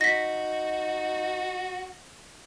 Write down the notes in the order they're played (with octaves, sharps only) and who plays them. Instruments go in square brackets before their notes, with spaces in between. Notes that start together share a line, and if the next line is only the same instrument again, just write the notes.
[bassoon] D#4 [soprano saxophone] F#4 [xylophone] A#6 B6